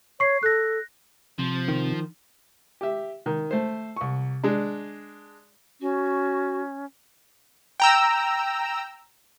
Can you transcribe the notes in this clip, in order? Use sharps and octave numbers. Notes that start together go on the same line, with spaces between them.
C#5 C#6 C7
A4 F#6 A#6
C3 F3
D#3
G4 E5
D#3
A3 C5
C2 C#6
G#3 D4
C#4 F#4
G5 A#5 E6